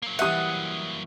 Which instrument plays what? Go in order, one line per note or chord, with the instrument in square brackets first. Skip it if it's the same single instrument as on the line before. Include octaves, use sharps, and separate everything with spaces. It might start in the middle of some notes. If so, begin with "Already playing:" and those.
[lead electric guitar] F#3 A#3
[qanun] E3 G3 G#5 [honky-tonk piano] E5 D#6 [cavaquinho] F#5